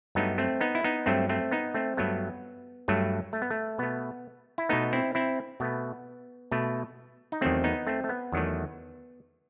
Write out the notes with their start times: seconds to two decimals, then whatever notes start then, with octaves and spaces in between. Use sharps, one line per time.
0.15 G2 F#3 A3 B3 D#4
0.38 A3 C4
0.61 B3 D#4
0.75 E4
0.84 B3 D#4
1.06 G2 F#3 A3 C4
1.29 A3 C4
1.52 B3 D#4
1.74 A3 C4
1.97 G2 F#3 A3 B3
2.88 G2 F#3 A3
3.33 A3
3.42 B3
3.51 A3
3.78 B2 A3 B3
4.58 E4
4.69 B2 A3 B3 D#4
4.93 C4 E4
5.15 C4 E4
5.60 B2 A3 B3
6.52 B2 A3
7.32 D#4
7.41 E2 D#3 F#3 A3 C4
7.64 B3 D#4
7.87 A3 C4
8.04 A3
8.09 B3
8.32 E2 D#3 F#3 A3